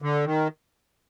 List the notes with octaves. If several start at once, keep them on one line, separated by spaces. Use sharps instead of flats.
D3
D#3